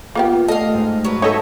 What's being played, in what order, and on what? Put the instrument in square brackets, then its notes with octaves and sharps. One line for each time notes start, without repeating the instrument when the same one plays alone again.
[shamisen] A#3 B3 G4 [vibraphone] F4
[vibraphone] A3 [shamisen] A4 [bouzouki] D#5 F5
[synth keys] G#2
[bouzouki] F#3 B4
[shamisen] D#4 F#4 A4 [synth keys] C#5 D#5 E5 [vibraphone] A5